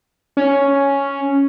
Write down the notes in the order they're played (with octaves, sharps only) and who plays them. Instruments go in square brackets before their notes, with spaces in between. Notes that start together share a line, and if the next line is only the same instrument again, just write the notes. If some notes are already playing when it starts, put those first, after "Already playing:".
[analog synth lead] C#4